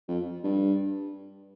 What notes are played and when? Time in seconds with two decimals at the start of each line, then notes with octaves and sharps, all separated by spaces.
0.08 F2
0.44 G2